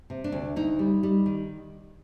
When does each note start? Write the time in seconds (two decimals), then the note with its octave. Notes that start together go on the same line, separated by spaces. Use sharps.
0.10 C3
0.24 D4
0.32 D2
0.56 D2 D#4
0.79 G3
1.03 G3
1.26 D#3